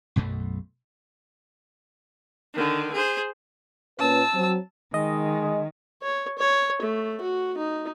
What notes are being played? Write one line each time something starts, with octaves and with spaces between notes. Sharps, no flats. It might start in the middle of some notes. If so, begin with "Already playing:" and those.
B1 F#2 B2 A3
D3 D#3
G#4 C5
A#2 C#4 B4 A5 E6
F#3 C4
D#3 G#3 D#5
C#5
C#5
A3
F#4
D#4